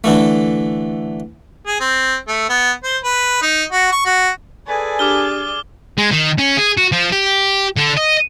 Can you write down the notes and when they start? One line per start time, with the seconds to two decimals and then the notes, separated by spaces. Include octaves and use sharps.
0.04 D3 E3 A3
1.67 G#4
1.80 C4
2.28 A3
2.50 B3
2.83 C5
3.04 B4
3.42 D#4
3.72 F#4
3.92 C#6
4.05 F#4
4.68 G#4 A4 B4 D5 G#5
4.99 D4 G4 D6 F6 G7
5.98 G#3
6.12 D#3
6.38 C#4
6.57 G#4
6.78 F#4
6.92 F3
7.12 G4
7.77 D3
7.97 D#5